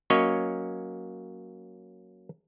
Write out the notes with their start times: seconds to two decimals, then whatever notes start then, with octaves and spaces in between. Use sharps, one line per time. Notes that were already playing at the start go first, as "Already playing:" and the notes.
0.10 F#3 A#3 C#4 C#5 D#5